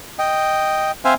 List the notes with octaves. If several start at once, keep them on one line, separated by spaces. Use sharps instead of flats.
D#5 G5
C4 C5 E5 F5 G#5